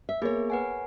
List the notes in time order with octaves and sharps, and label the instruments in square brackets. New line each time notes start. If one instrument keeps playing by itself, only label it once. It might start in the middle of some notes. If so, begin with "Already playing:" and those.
[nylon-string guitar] E5
[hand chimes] A#3 B3 G#4 [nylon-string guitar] A#4 C#5
[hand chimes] B4 F#5 G#5